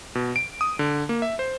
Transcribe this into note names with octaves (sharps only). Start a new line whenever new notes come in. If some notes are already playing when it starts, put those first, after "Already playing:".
B2
D7
D#6
D3
A#3
E5
C5